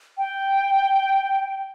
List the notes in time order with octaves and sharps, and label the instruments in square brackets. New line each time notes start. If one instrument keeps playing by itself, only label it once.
[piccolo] G5